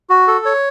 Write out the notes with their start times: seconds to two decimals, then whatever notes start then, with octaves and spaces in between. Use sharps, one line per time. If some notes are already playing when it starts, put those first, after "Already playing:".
0.10 F#4
0.28 A4
0.46 C#5